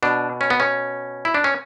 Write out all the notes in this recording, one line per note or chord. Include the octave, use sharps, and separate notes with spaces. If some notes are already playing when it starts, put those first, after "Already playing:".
B2 D4
C#4
B3
C#4
E4
D4
C#4